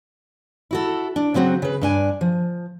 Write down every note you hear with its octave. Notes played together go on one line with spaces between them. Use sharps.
E4 F#4 A4
D4
C#3 F#3 C4 F#4
C#3 B4
G2 D4 G#5
F3